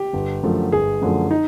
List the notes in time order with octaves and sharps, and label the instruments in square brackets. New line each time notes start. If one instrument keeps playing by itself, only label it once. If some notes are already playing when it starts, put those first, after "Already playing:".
Already playing: [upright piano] G4
[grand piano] G1
F#2 D3 F3 A3
[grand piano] G1 [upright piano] G#4
[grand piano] F#2 D3 F3 A3
[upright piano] D#4